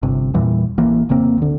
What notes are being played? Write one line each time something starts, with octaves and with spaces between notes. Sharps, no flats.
G1 C3
E2 A#2 E3 G3
A1 E3 A#3
F1 C#3 A#3 C4
D2 D3